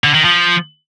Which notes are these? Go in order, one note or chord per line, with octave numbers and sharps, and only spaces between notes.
D3
D#3
F3